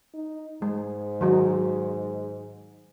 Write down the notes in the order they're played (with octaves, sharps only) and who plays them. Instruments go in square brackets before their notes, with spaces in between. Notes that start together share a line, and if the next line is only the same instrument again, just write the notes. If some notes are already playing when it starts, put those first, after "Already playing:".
[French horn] D#4
[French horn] G#2 [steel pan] G#3
[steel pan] D#3 F#3 D#4